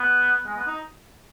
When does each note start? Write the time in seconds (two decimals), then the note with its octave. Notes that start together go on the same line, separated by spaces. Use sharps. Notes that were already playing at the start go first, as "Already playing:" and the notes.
Already playing: B3
0.46 G#3
0.57 B3
0.67 D#4